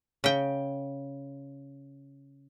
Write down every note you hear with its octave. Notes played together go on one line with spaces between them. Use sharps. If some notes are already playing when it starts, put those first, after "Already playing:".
C#3 G5